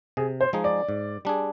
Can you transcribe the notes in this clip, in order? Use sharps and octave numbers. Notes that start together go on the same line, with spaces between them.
C3 G#4
C5
F3 G#3 D#4 G#4
D5
G#2
G3 D4 G#4